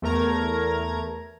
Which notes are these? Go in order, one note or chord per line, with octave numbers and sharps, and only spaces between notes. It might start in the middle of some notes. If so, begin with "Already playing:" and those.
E2 A3 A#4 A#5 G#6